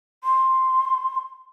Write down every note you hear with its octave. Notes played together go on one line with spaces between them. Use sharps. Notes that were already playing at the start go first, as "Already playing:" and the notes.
C6